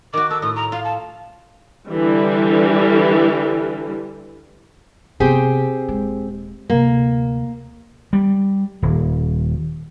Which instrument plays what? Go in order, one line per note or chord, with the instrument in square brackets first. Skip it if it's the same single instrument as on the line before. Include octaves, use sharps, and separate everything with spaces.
[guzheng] D#3 F#4 [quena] D6
[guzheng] A4 [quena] E6
[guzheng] A2 C#5 [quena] D#6
[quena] A#5
[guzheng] F4 [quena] F5
[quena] A5
[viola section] D3 E3 G3
[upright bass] C3 B3 [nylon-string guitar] C4 G4 G#4
[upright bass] D#1 G#3
[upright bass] D2 C3 [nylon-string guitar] A#3
[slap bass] G3
D#1